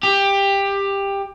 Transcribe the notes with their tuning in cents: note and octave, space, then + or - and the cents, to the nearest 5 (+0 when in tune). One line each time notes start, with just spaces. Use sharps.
G4 +15